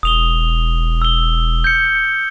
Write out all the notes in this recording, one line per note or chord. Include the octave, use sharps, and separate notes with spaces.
E1 D#6 F7 G7
E6 G7
G6 C#7